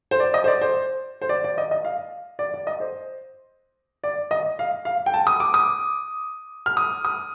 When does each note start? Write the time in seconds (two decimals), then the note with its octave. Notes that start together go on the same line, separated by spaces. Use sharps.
0.11 C5
0.20 D5
0.34 D#5
0.44 C5
0.48 D5
0.61 C5
1.22 C5
1.29 D5
1.44 D5
1.58 D#5
1.71 D#5
1.85 F5
2.39 D5
2.54 D5
2.67 D#5
2.80 C5
4.04 D5
4.31 D#5
4.59 F5
4.85 F5
5.06 G5
5.14 A5
5.27 D#6
5.40 D6
5.54 D#6
6.66 F6
6.77 D#6
7.05 D#6